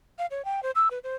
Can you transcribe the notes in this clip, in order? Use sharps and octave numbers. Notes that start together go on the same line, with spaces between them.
F5
C#5
G5
C5
E6
B4
C5